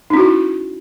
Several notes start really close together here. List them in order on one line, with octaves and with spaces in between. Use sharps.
D#4 C#4 F#4 E4